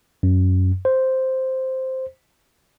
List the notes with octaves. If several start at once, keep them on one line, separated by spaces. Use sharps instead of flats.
F#2
C5